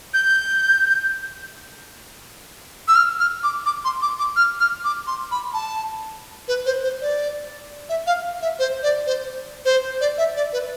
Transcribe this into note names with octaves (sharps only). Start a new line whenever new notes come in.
G6
E6
F6
F6
D6
D6
C6
D6
D6
F6
F6
D6
C6
B5
A5
B4
C5
C5
D5
E5
F5
E5
C5
D5
C5
C5
D5
E5
D5
B4